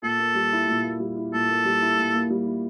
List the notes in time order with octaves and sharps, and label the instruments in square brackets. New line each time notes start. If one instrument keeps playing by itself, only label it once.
[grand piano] A#2 [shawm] A4
[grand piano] A#3
G3
E4
A#2
A#3
G3
E4
[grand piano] A#2 [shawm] A4
[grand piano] A#3
G3
E4
A#2
A#3
G3
E4